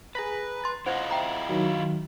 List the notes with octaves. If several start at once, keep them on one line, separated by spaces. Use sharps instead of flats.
G#4 B4 A#5 B5
C6 A6
E4 F4 C5 D#5 F#5 G#6
E5 G5 A#5
D#3 F#3